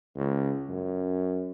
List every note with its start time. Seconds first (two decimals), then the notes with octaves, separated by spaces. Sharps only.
0.16 C#2
0.69 F#2